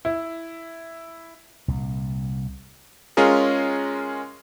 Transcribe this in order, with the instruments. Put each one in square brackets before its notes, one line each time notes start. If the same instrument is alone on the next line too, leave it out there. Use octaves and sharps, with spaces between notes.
[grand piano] E4
[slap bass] C2 A#2
[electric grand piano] G#3 C#4 F4 G#4 A#4